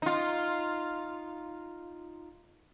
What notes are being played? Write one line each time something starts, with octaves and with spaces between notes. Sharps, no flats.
D#4 F4